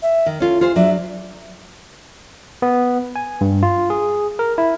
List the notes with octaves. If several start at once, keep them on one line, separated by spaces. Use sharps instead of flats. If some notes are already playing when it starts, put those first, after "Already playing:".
E5
D#3
C#4 F4 A4
F4 G#4 C5
F#3 D4 E5
B3
G#5
G2
F4
G#4
A#4
E4